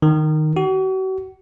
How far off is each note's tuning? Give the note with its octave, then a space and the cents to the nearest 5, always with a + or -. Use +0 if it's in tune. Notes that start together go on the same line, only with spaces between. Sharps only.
D#3 -10
F#4 +40